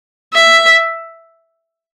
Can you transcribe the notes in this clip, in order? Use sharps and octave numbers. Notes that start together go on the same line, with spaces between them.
E5